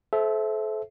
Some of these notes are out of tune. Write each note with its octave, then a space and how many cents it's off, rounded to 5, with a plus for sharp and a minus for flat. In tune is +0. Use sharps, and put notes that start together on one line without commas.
A4 -30 C5 +0 E5 +0